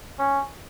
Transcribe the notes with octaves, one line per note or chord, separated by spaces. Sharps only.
C#4